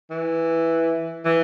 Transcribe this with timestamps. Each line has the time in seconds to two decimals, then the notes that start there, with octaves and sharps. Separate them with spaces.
0.10 E3
1.25 E3